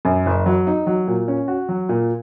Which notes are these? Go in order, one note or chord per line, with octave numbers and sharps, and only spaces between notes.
F#2
F#1
F#3
D#4
F#3
A#2
C#4
F#4
F#3
A#2